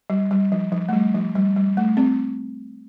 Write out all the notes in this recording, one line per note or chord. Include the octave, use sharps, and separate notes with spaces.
G3
G3
F3
F3
A3
G3
F3
G3
G3
A3
C4